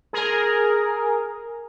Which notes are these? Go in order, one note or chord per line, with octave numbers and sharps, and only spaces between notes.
G#4 A#4